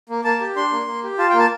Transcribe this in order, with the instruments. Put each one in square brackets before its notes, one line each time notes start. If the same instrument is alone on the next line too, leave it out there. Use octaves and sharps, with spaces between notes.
[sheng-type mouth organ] A#3
A#3 A5
G4
D4 C6
A#3
A#3
G4
F4 A5
G5
A#3
A5